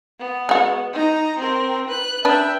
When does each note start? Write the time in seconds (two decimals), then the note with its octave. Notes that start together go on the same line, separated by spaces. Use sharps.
0.20 B3
0.49 G#3 F#4
0.93 D#4 A#5
1.38 C4 A#4
1.88 B4 F#6
2.25 D4 B4 E5 G5